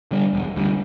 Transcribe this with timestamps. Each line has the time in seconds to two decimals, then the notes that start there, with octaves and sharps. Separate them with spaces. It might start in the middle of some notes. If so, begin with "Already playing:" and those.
0.11 D3 G3 D4
0.33 E1
0.56 D2 D3 G3